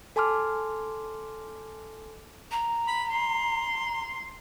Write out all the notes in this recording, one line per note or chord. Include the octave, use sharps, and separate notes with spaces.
A4 G#5 A5 C6 D6 F6
A#5
B5
C6